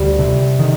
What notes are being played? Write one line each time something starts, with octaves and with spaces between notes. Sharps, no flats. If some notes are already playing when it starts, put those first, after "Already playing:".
Already playing: D2 G3
C3
D#3